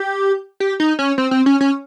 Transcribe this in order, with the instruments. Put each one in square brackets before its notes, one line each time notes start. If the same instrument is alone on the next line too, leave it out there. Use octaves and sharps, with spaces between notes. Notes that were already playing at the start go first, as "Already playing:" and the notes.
Already playing: [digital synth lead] G4
G4
D#4
C#4
C4
C4
C#4
C#4